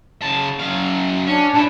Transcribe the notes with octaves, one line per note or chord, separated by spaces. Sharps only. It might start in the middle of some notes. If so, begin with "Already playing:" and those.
C#3 A5
F#2 F5
C#4 D4
A#2 E4